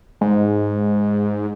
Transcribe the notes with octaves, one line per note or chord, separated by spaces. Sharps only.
G#2